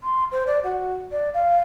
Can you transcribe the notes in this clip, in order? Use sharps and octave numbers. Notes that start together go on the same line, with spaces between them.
C6
C5
D5
F#4
D5
F5